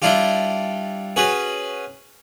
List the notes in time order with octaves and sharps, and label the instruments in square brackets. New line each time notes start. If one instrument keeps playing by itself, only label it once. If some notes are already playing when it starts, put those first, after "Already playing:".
[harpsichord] G3 D4 E4 F4 G4
C#4 F#4 G#4 B4